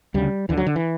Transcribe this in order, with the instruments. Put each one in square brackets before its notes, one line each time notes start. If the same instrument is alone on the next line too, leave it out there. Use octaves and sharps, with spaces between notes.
[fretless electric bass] D2 C#3 G3
D2 D3 E3
F#3
D3
E3